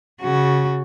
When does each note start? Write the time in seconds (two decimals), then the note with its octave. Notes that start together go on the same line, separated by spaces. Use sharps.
0.21 C#3 F#4